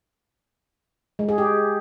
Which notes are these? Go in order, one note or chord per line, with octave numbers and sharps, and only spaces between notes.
G#3
G#4
G4